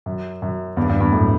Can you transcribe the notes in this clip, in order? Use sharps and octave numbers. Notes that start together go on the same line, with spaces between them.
F#2
F#2
E2 G2
E2 G2
E2 G2
F#2 A2